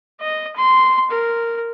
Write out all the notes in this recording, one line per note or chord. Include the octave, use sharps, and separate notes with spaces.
D#5
C6
A#4